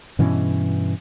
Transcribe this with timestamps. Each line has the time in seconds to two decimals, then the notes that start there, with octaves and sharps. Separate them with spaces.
0.19 G2 B2 E3 C#4